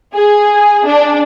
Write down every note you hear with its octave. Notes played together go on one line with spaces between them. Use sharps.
G#4
D4